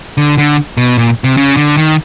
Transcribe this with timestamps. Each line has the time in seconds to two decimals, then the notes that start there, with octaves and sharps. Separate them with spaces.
0.18 D3
0.38 D3
0.77 B2
0.98 A#2
1.24 C3
1.37 C#3
1.57 D3
1.77 D#3